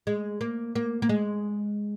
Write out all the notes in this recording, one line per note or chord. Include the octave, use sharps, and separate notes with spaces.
G#3
A#3
A#3
A#3
G#3